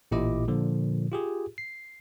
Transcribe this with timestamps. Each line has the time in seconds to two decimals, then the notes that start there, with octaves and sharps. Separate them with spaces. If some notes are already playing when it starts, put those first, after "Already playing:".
0.11 A1 A#2 E4 G4 D#5 D6
0.48 A#2 D3 F3
1.12 F4 G4 G#4
1.58 C7